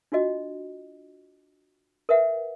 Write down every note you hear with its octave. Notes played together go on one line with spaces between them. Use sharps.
D4 F4 F#4 D#5
A#4 B4 E5 F#5